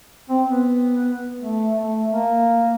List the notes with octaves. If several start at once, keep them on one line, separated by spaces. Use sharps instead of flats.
C4
B3
A3
A3
A#3